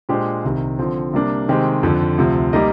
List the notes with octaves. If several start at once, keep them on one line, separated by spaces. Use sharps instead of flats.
A#2 G#3 D4 G4 C5
C2 C3 D#3
D3 F3 C4
C3 G3 A#3 D4
C3 D#3 G#3 C4 G4
F2 D3 F3
D2 C3 F3
G3 A#3 D#4 A#4 D#5